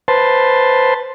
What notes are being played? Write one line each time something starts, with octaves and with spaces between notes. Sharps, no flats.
B4 C5 A5 C6